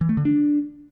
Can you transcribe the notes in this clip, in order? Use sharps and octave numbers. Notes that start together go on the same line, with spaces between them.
E3
A3
D3
D4